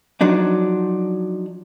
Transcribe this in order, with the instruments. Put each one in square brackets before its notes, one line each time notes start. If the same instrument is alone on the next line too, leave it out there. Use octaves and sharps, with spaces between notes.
[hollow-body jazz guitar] F3 F#3 D4 D#4